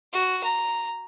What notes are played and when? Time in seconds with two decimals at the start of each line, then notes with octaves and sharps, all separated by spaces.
0.13 F#4
0.43 A#5